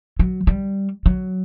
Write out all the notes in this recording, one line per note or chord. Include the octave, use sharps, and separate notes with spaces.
F#3
G3
F#3